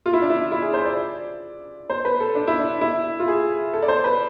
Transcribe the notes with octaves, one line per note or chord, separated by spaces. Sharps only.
F4
E4
D4
E4
E4
G#4
C5
D5
C5
B4
A4
D4
E4
D4
E4
F4
G#4
A4
D5
C5
B4